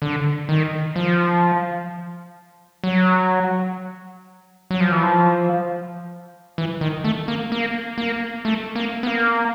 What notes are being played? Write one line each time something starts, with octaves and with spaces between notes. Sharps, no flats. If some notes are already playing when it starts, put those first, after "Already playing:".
D3
D#3
F3
F#3
F#3
F3
E3
F3
E3
D#3
A3
A#3
A#3
A#3
A3
A#3
B3
A#3